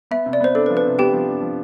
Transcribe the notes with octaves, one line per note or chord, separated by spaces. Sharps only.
B3 E5
C3
D5
B3 C5
D4 A4
B4
F3
B4
C3
B3 G4 G5
F3
D4
F3